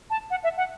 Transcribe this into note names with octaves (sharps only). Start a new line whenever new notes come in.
A5
F#5
E5
F#5